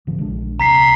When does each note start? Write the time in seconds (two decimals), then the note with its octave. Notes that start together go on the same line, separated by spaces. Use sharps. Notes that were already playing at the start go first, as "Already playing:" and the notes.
0.07 G#1 D3 F3
0.18 A#1 G#3 D4
0.60 D#1 C2 A#5 B6 C7